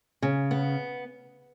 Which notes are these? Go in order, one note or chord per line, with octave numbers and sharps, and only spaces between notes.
C#3
B3